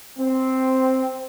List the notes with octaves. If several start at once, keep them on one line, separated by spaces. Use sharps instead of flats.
C4